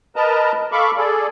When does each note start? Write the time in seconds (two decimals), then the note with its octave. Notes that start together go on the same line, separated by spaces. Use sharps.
0.16 A#4 B4 D#5 A5 A#5
0.72 A4 F5 B5 C#6 D6
0.97 G#4 A4 D5